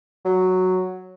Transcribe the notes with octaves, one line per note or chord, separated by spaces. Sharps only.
F#3